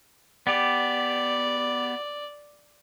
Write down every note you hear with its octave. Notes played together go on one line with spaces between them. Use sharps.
B3 G4 D5